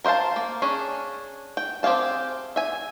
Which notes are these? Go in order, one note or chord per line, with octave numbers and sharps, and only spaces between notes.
A#4 C5 D#5 F5 A5
A#3
C#4 D4 G#4
G5
C4 G4 G#4 F5 A5
E5 G#5